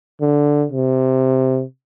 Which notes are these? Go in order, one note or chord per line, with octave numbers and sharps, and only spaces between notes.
D3
C3